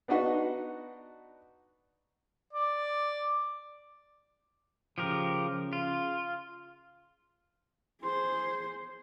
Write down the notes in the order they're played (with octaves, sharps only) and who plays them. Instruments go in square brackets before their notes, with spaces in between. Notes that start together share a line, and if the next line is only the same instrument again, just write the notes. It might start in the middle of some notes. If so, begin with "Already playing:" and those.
[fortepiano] B3 D4 D#4 F#4 B4 D#5
[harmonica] D5
[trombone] C#3 [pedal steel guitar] F3 G4 A#4
[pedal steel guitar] F4
[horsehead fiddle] G#4 C5 [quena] C6